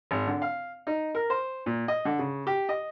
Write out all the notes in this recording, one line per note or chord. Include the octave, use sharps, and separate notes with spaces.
G#1
D3
F5
D#4
A#4
C5
A#2
D#5
D3
C#3
G4
D#5